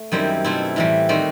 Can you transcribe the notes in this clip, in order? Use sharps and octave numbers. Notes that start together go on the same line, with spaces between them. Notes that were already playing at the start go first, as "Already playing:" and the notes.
Already playing: A3
F#2 D#3 G3 C4 E4
B2 A3 C4 E4
A2 E3 G3
D#3 G3 C4 F#4